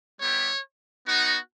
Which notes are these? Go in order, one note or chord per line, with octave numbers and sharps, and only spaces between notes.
G3 B3 E4 G4 C#5
B3 D#4 F#4